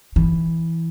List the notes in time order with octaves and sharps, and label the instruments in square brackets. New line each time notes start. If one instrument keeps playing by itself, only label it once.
[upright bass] E3